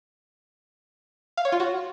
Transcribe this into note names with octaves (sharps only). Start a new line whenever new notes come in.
F5
C#5
F4
F#4